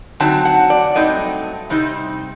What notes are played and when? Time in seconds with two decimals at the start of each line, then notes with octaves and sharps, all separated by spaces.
0.20 D3 F#3 C4 D#4 A5
0.45 F#5
0.70 D5
0.95 G2 F#3 A3 C4 D#4 D#5
1.70 C3 G3 C4 D#4